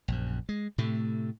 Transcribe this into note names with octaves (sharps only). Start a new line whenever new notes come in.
A#1 F#2
G#3
A2 C3 A3